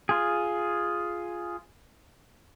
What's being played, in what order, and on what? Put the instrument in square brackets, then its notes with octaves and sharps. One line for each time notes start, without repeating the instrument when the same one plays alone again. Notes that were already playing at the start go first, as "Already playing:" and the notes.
[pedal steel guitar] F4 G#4